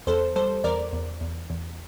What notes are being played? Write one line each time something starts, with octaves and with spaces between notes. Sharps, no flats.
E2 A4 C5
G3 A4 C5
E2 A#4 D5
E2
E2
E2